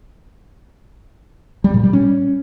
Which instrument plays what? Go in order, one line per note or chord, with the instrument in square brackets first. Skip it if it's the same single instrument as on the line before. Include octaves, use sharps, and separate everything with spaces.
[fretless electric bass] G3
A#2
G3
C#4